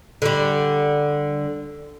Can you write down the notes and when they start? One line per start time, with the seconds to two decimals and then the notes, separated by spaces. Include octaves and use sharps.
0.22 D3 G3